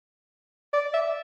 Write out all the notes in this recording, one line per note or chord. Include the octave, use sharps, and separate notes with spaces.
D5
E5